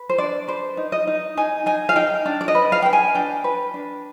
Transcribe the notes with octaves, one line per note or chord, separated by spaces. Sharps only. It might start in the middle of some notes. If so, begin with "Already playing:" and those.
Already playing: B4
C5
D4 D5
B4 C5
D#4
D#5
D#4
D#4 G#5
D#4 G#5
F5
D#4 G5
D4
D5
D#5
B4
F5
B4 G5
G#5
D4 G5
B4
D4